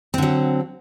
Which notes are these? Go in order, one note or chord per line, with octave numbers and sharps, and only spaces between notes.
D3 F#3 C4